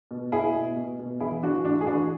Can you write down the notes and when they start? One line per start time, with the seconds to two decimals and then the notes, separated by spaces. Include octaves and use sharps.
0.11 B2
0.32 B2 E4 G#4
0.55 B2
0.76 B2
0.99 B2
1.20 E3 E4 G#4
1.43 E3 D4 F#4
1.65 A2 D4 F#4
1.81 G#4
1.87 E3 D4 F#4